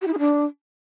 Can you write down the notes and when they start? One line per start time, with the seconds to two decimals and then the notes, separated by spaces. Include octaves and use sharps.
0.01 G4
0.07 E4
0.13 G#4
0.18 D4